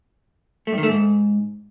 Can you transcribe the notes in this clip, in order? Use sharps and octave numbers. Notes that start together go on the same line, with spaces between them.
A3
G2
D#3
A3
G#2